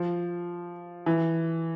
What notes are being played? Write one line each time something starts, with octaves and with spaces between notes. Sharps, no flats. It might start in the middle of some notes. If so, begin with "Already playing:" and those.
Already playing: F3
E3